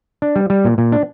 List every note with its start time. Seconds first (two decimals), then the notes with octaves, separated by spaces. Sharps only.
0.22 D4
0.36 G3
0.50 G3
0.65 A#2
0.78 A#2
0.92 D4